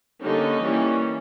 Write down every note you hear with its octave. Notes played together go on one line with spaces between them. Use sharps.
D3 G3 A#3 C#4 D#4
E3 G3 A#3 C#4